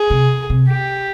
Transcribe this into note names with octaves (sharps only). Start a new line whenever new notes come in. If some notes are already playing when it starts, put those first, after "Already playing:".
Already playing: G#4
C3
C3
G4